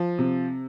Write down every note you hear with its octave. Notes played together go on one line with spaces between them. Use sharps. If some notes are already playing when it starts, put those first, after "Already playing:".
Already playing: F3
C3